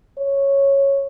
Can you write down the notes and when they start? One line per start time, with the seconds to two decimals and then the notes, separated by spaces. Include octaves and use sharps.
0.18 C#5